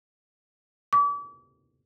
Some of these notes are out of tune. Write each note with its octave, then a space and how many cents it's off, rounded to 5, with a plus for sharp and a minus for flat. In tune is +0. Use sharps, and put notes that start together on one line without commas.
D6 -40